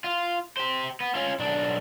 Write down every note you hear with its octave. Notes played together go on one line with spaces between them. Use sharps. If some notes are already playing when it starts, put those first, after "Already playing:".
F4
G4 C5
B3
C#4 F4
B1 D4